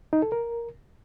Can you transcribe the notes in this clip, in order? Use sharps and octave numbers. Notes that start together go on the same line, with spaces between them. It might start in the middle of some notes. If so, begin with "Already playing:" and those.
D#4
A4
A#4